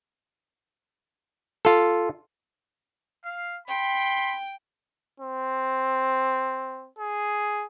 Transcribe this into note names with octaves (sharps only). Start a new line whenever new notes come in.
F4 A4
F5
G5 B5 C6
C4
G#4